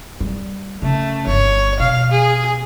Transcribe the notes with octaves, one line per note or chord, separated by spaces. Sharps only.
G3
C#3 A3
G1 C#5
B2 F5
G#4